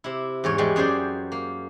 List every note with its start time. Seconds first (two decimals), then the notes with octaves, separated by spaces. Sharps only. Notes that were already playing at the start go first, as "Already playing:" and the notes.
0.04 C3 E4
0.44 E2 G#2 C#5
0.58 E2 G3 G#3
0.76 F#2 G#4 C5 D5 G5
1.32 A#3